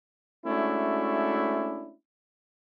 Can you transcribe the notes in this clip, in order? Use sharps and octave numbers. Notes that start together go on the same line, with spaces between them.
G#3 A3 C#4 D4 E4 F#4